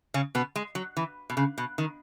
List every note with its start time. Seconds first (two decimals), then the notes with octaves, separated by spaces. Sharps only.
0.14 C#3 C#4
0.35 B2 B3
0.56 G#3
0.75 F#3
0.97 E3
1.30 B2
1.37 C#3
1.58 B2
1.78 D#3